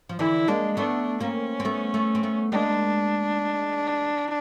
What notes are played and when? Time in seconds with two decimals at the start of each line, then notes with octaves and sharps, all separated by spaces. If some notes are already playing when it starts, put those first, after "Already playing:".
0.09 F3
0.19 D3 E3 E4
0.48 G#3 A#3 D4
0.77 A3 B3 D4
1.20 A#3 C4 C#4
1.60 C4
1.65 A3 B3
1.94 A3 B3
2.15 C4
2.23 A3 B3
2.52 G#3 A#3 D4